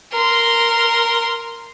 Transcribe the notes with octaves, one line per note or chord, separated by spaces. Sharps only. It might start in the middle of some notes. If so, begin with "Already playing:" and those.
A#4 C6